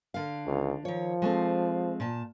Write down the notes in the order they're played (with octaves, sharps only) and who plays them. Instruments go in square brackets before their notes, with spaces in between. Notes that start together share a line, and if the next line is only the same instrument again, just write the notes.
[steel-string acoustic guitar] D3 F5
[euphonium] C#2
[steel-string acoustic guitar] D#3 C#5 [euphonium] F3
[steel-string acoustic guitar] G#3 A3 C4
A#2 A5